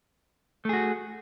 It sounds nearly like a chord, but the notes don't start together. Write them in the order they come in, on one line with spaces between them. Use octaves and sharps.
A3 G#4 F#4